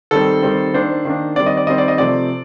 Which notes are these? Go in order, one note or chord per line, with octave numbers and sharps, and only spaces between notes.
D#3 G3 C4 A4
D#3 G3 C4
D#3 A#3 D4 C5
D#3 A#3 D4
D#3 G3 C4 D5
D#5
D5
D#3 G3 C4 D#5
D5
D#5
C3 F3 A3 C4 D5